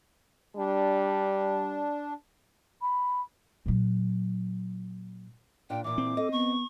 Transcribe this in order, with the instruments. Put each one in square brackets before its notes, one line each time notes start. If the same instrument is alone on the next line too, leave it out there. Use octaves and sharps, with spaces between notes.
[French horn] G3 [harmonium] D4
[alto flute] B5
[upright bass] A#2 F#3
[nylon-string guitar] A#2 D4 [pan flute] G5
[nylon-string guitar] A#2 E3 [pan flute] D6
[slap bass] C4
[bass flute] A4 [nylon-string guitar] D#5
[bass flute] B3 [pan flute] C#6